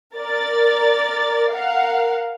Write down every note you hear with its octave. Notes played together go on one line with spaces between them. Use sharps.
A#4 D5 A6
A#4 F5 F#5